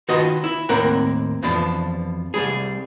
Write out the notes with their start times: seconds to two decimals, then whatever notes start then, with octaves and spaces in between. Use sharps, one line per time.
0.08 D#3 F4 F#4 B4 D#5
0.44 E4
0.69 D#2 A2 A#3 C4 A#4 F#5
1.42 F2 B2 E3 F3 D4
2.34 C2 F2 G3 G#4